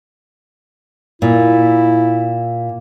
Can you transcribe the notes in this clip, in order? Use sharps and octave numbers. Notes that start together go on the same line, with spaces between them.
A#2 E4